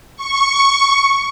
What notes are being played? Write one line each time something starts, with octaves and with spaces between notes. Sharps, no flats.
C#6